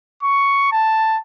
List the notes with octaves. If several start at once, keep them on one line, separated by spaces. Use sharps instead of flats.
C#6
A5